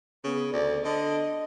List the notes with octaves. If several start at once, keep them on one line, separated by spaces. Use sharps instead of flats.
C#3 B3
D2 D5
D3 D#5